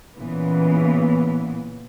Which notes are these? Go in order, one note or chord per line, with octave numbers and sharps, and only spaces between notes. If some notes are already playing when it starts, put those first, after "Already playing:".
A#2 C#3 E3 B3